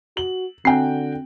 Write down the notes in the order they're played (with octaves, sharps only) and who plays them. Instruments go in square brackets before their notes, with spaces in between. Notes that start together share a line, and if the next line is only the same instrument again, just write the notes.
[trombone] F#4 [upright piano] F#7
[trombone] D3 [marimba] C4 G#5 [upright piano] F#4 G5